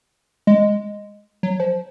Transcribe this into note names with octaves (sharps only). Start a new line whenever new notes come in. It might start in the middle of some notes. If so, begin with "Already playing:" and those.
G#3
F#3
F3